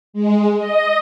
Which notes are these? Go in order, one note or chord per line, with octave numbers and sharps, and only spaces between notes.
G#3
D#5